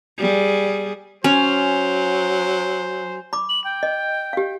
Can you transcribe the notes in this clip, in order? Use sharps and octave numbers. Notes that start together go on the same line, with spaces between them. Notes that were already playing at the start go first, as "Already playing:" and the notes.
G3 G#4
F#3 C#4 C5 G#5 F7
B5 D6
F#7
G5
D#5
G4 F5